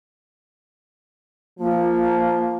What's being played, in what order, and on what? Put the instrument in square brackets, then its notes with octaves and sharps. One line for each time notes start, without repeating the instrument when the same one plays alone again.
[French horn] F3 [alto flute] A#3